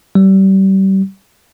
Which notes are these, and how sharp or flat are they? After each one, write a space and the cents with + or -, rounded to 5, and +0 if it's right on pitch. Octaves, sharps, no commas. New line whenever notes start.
G3 -30